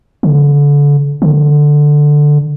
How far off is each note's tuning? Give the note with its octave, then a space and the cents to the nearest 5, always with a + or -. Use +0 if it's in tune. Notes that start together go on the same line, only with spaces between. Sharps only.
D3 -30
D3 +5